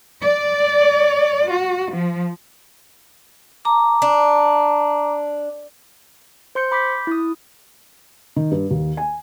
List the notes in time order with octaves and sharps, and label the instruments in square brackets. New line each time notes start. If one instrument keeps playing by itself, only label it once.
[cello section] D5
F#4
F3
[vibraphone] A5 A#5 D6
[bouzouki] D4
[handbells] C5 C6 G6 C#7
B5 D6 G6 B6
E4 D#6
[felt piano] D#3
G2
D#2
G#5